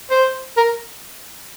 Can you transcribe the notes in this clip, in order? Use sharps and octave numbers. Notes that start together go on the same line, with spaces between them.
C5
A#4